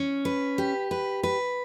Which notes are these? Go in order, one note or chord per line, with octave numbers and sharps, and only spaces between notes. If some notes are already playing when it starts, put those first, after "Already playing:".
Already playing: C#4
B4
G4
B4
B4